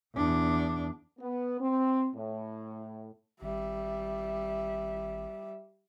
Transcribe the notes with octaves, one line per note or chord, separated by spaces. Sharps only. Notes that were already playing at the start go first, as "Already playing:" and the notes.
E2 D4
B3
C4
A2
G#1 G3 E5